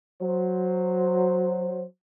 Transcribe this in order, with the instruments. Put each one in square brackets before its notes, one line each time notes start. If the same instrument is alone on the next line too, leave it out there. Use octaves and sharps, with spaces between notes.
[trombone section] F#3 C5